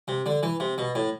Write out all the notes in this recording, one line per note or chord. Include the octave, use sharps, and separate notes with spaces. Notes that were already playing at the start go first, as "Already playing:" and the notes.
C3
D3
E3
C3
B2
A2